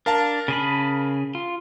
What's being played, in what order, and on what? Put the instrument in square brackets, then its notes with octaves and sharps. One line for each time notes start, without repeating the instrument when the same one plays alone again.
[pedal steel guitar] D4 [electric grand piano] A#4 F5 A5
[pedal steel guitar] C#3 G#4 B5
F4